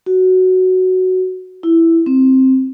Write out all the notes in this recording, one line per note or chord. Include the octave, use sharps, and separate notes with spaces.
F#4
E4
C4